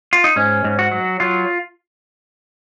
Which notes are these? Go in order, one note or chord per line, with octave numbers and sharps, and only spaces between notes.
F4
D#4
G#2 C#4
G#2
F#4
F#3
F#3 F4